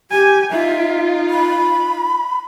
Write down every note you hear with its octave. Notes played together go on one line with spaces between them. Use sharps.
G4 G#5
D#4 F4 E5
B5